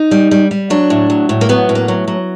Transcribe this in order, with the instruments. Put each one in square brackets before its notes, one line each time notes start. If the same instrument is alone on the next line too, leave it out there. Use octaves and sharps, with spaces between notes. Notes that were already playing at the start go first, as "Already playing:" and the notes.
Already playing: [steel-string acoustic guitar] D#4
G3
G3
G3
F#3 D4
A2
F#3
A2
A#3
F#3 B3
A2
A#3
F#3
F#3